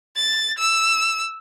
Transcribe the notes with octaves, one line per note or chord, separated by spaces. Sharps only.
A6
E6